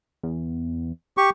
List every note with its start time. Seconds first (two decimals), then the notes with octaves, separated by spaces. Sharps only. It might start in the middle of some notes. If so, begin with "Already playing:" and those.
0.23 E2
1.17 G4 C#6